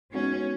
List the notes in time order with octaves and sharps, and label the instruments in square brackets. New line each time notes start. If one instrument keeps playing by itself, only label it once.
[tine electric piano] G#3 B3 D#4 F#4 C#5 [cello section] C#4